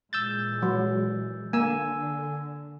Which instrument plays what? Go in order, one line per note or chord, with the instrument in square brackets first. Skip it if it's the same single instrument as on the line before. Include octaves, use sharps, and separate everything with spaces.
[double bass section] A#2 E3 G#3 [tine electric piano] E6 G6 A6
[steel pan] F#3
[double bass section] D3 [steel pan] A#3 [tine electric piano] G#5 E6